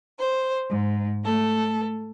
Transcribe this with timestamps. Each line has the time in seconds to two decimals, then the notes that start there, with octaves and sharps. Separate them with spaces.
0.19 C5
0.69 G#2
1.24 A3 A4